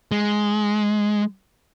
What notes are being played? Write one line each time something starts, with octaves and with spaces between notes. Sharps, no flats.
G#3